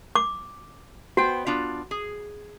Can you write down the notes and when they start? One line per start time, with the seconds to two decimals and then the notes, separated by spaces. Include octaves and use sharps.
0.15 D6
1.17 B3 F#4 C5 G5
1.47 B3 D4 F4
1.91 G#4